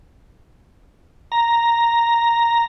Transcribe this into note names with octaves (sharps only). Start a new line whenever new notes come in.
A#5